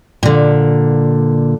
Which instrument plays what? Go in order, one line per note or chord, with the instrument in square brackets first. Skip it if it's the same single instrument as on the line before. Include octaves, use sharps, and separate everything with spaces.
[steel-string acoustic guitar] A#2 D3